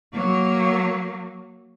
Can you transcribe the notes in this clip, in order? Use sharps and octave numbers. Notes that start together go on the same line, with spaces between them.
F#3 A#3